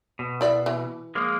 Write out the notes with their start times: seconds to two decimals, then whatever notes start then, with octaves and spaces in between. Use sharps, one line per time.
0.19 B2
0.41 E4 D5 E5
0.66 E3
1.15 F3 G#3 A#3